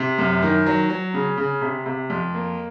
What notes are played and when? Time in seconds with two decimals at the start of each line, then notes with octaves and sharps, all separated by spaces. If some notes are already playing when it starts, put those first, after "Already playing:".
Already playing: C3
0.18 F#2
0.42 D#3
0.66 F#3
0.90 F#3
1.14 C#3
1.37 C#3
1.61 C3
1.86 C3
2.10 F2
2.34 A#3